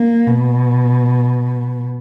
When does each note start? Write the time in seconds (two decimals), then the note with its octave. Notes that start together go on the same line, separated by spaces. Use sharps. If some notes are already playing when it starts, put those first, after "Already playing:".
Already playing: A#3
0.26 B2